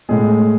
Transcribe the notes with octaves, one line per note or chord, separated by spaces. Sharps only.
A2 G#3 G#4